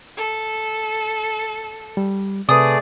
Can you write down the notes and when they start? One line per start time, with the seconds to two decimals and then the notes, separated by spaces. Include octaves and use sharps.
0.16 A4
1.97 G3
2.49 C3 A3 G#4 B4 D5 D#6